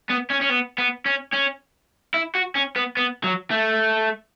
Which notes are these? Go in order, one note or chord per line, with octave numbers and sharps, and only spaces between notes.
B3
C#4
C#4
B3
B3
C#4
C#4
E4
F#4
C#4
B3
B3
F#3
A3